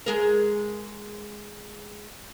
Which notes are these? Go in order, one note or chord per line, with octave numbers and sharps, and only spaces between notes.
G#3 G#4 A#4